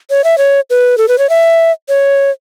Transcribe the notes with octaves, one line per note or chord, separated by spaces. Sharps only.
C#5
E5
C#5
B4
A4
B4
C#5
E5
C#5